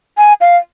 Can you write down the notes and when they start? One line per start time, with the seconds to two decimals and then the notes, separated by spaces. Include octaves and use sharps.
0.18 G#5
0.41 F5